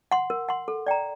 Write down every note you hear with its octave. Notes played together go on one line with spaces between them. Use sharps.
F#5 C6
A#4
F#5 C6
A4
D5 G5 A#5